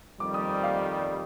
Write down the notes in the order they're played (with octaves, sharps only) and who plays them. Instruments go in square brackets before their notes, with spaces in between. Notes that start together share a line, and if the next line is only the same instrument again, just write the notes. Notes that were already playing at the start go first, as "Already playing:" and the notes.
[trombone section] F2 D#3 G3 [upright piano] D6
[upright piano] D#6
D#6
F5
F5